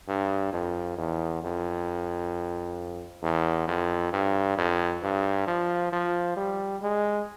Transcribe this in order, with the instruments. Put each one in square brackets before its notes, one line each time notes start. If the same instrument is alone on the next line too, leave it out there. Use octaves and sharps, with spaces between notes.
[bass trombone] G2
F2
E2
F2
E2
F2
G2
F2
G2
F3
F3
G3
G#3